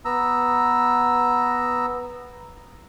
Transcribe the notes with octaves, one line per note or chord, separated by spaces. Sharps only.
B3 A#5 E6